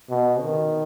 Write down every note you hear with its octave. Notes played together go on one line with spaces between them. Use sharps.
B2
D#3